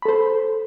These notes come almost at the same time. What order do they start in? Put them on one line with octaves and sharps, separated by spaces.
B5 A4 C5